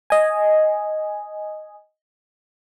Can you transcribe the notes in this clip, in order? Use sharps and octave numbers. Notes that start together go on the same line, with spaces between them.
D#5 G#5